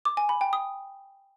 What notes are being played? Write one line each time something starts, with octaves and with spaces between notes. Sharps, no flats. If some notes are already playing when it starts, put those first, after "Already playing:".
D6
G#5
B5
G5
D#6